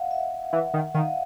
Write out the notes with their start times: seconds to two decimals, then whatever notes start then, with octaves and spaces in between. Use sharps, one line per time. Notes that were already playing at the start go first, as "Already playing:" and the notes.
Already playing: D#5 F5 F#5
0.11 E5 F#5
0.53 E3
0.74 D#3
0.87 F#5
0.94 D#3 D#5 F5